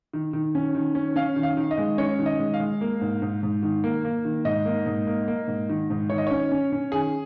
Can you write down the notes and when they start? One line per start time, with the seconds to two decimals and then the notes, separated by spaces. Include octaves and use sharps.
0.13 D#3
0.33 D#3
0.55 C#4
0.75 D#3
0.95 C#4
1.16 C#4 F5
1.36 D#3
1.43 F5
1.57 D#3
1.71 D#5
1.78 G#3
1.98 C#4 C#5
2.19 D#3
2.26 D#5
2.40 G#3
2.54 F5
2.60 G#3
2.81 A#3
3.01 G#2
3.22 G#2
3.43 G#2
3.63 D#3
3.84 A#3
4.05 A#3
4.25 D#3
4.45 G#2 D#5
4.65 A#3
4.86 G#2
5.07 A#3
5.28 A#3
5.48 G#2
5.69 D#3
5.90 G#2
6.10 D#3 C#5
6.18 D#5
6.27 C#4 C#5
6.51 C#4
6.72 C#4
6.92 D#3 G#4